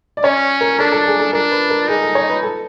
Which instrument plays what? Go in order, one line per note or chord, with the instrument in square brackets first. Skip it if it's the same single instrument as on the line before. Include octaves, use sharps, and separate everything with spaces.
[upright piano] D5
[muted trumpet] C#4 [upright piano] C#5
[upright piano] A#4
[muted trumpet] D4 [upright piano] A4
[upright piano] A4
G#4
A4
[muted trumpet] D4 [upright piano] A#4
[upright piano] B4
A#4
[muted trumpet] D#4 [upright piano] G#4
[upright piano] A4
C#5
B4
A4